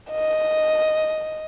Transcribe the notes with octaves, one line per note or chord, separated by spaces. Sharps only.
D#5